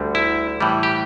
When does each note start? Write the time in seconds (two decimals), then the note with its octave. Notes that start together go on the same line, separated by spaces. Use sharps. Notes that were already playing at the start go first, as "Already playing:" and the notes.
Already playing: D2 D3 G3
0.15 E4
0.60 A2 E3 G3
0.83 G4